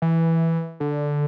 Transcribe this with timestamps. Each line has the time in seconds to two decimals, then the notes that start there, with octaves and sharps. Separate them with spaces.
0.02 E3
0.80 D3